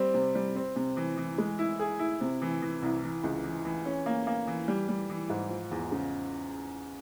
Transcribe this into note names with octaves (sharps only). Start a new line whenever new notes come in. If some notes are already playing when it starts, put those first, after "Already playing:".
Already playing: G3 C4
C3
G3
C4
C3
E3
E3
G#3
E4
G#4
E4
C3
E3
E3
C2
E3
C#2
E3
E3
C#4
A#3
A#3
E3
G3
G3
E3
G#2
F3
E2
C#3